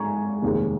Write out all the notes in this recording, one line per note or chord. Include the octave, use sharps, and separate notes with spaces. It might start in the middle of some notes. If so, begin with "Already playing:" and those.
Already playing: G#2 G#5 A#5 C#6
F1 D#2 D#3 G#3